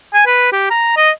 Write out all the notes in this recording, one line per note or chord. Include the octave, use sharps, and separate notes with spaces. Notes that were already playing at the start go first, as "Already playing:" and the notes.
G#5
B4
G4
A#5
D#5